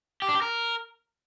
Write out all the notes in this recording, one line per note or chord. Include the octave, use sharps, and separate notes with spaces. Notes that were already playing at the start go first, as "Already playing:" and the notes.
G4
D4
G4
A#4